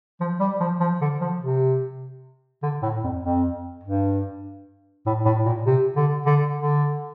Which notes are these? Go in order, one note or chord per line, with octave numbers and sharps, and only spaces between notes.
F3
G3
F3
F3
D3
F3
C3
D3
A2
F2
F2
G2
A2
A2
A#2
C3
D3
D3
D3